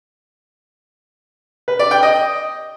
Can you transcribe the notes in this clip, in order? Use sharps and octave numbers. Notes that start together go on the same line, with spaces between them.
B4
D5
G5
D#5